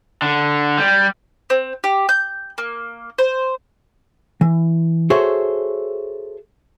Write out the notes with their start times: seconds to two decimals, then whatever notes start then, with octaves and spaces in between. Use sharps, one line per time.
0.22 D3
0.78 G3
1.50 C4
1.84 G4
2.09 G6
2.58 A#3
3.18 C5
4.41 E3
5.10 F#4 G#4 A4 C5 C#5 E5